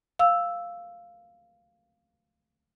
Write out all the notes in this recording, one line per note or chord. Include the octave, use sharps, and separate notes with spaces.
F5 E6